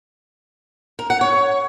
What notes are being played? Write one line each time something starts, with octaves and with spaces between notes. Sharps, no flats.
A#4
F#5
C#5